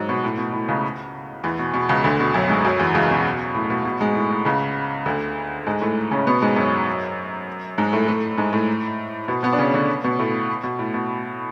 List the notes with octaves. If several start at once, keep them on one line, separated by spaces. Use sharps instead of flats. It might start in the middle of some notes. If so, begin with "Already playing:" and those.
Already playing: G#2 F#3
B2
A2
B2
A2
C#2 C#3
E2 E3
B2
B2
C#2 C#3
D2 D3
B2
F#2 F#3
G#2 G#3
F#2 F#3
E2 E3
C#2 C#3
B2
A2
B2
B2
G#2 G#3
A2
A2
C#2 C#3
D2 D3
G#2 G#3
A2 A3
C#3 C#4
B2 B3
G#2 G#3
F#2 F#3
G#2 G#3
A2 A3
A2 A3
G#2 G#3
A2 A3
B2 B3
B2 B3
D4
C#3 C#4
D3 D4
B2 B3
A2 A3
B2
A2
B2